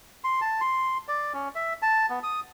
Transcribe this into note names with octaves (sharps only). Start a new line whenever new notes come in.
C6
A5
C6
D5
C#4
E5
A5
B3
D#6